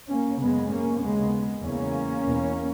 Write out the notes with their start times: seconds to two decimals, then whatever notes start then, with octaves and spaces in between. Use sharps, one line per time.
0.08 A#3 C#4
0.39 F#2 C#3 G#3 B3
0.71 A#3 C#4
1.01 D#2 C#3 G#3 B3
1.63 E2 C#3 A#3 C#4
2.24 E2 B2